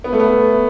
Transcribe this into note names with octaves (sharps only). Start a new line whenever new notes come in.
B3
A3
B3